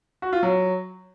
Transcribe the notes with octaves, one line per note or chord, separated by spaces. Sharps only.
F#4
F4
F#3